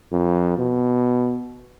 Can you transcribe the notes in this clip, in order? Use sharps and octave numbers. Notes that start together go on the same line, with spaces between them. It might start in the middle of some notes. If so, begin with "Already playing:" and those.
F2
B2